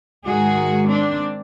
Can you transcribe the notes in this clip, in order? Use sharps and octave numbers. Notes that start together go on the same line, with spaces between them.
G#2 D#3 G#3 F#4 G#4
C4 D4